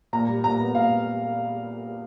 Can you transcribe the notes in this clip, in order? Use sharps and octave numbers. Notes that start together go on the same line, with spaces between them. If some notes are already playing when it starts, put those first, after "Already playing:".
A#2 A#5
G3
A#2 A#5
B3
A#2 F5